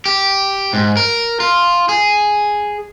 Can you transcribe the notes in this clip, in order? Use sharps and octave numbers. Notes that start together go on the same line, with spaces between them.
G4
G#2
A#4
F4
G#4